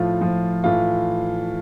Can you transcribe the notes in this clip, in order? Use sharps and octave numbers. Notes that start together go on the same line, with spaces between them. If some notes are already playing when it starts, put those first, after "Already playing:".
Already playing: A2 F3 F4
A2 F3
A2 E3 F4